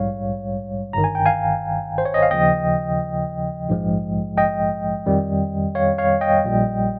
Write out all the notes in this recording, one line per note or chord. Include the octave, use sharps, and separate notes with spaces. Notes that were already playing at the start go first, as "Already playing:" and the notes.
Already playing: A#1 G#2 G3 C#5 F5
G1 G2 D#3 A#5
G#5
G5
F5 G#5
C5
C#5
D#5
F5
D#2 C#3 F3 D#5 G5
A#1 G#2 F3 G#3
D#5 G5
F2 D#3 G3
C#5 F5
C#5 F5
D#5 G5
A#1 A#2 G3